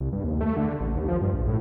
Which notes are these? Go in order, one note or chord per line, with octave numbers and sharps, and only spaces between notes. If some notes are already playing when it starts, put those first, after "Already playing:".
C2
G2
D#2
A3
D3
A1
D#2
F3
G2
A#1
A2